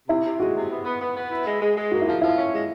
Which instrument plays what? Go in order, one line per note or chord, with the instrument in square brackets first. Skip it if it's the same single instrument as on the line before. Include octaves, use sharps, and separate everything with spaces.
[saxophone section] C3 [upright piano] E4
[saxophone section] C3
[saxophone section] G#3 [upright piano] F#4
[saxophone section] C3
B3
B3
B3
B3
E4
G#3
G#3
G#3
[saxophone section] A#3 [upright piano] F#4
[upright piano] E4
[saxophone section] F3 [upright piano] F4
[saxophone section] F3 [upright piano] E4
[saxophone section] C#4
G#3